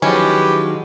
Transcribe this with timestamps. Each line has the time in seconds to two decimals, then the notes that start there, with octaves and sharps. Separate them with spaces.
0.02 D#3 F3 F#3 G#3 C#4 E4 G4 B4